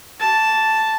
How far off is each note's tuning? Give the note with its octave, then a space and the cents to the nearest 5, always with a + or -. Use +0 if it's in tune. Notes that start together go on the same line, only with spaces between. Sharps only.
G4 -45 A5 +0